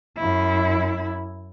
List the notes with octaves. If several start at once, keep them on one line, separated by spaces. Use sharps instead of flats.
F#2 E4